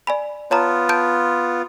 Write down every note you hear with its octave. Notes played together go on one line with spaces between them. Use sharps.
D5 G#5 B5
B3 F4 C#5 A5 A#5
A5 G6 D7